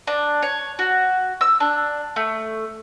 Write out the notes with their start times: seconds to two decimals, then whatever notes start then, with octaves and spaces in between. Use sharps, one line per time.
0.07 D4
0.42 C#5
0.79 F#4
1.41 E6
1.60 D4
2.16 A3